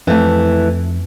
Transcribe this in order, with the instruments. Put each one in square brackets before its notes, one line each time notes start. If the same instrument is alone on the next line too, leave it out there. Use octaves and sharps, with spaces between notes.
[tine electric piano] F2 [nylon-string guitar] E3 A3